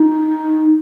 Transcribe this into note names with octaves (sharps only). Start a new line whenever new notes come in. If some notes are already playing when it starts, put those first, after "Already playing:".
Already playing: D#4